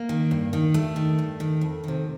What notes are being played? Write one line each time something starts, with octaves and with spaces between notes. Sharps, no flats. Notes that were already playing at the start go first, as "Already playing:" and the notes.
Already playing: A#3
D#3
G2
D#3
G2 A3
D#3
G2
D#3
F2
C3 D#3